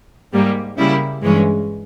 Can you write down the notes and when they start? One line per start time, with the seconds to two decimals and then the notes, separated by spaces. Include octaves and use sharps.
0.32 G#2 G3 A#3
0.77 C#3 G3 A#3 E4
1.22 G2 E3 G#3 C#4